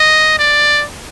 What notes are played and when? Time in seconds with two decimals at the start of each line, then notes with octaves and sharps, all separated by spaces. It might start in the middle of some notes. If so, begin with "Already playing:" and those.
Already playing: D#5
0.39 D5